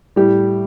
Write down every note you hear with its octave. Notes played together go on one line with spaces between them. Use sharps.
A2 G3 G4